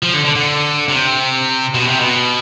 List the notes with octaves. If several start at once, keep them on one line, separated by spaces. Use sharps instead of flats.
F3
D3
D3
D3
C3
B2
C3
B2